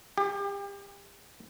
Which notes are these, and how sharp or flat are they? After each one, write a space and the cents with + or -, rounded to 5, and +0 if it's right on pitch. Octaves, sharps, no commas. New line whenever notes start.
G4 +35